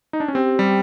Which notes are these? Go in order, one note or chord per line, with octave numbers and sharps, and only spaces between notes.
D#4
D4
C#4
C4 G4
G3